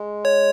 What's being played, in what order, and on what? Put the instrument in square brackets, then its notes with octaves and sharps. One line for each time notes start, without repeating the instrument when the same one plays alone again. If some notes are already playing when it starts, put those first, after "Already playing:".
Already playing: [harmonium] G#3
[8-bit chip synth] C#5